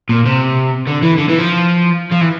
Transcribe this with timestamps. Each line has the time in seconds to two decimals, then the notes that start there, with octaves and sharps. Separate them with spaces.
0.09 A#2
0.26 C3
0.87 D3
1.02 E3
1.18 D3
1.29 E3
1.39 F3
2.11 F3
2.21 E3